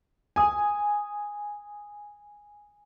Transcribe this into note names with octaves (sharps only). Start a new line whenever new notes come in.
G#5 D#6